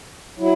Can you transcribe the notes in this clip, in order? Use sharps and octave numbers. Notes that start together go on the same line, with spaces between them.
F#3 E4